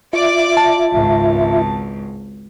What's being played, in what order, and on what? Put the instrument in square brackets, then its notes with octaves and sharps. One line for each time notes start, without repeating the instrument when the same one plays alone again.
[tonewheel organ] F4 E5 [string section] D5 D6
[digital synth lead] A5
[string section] G#1 C#2 G#2